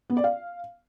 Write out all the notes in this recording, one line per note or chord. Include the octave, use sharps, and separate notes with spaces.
B3
D5
F5